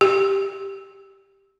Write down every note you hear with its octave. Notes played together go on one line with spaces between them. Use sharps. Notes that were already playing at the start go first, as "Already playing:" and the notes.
G4